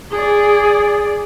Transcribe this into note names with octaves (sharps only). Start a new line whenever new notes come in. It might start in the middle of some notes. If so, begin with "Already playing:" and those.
G#4 D5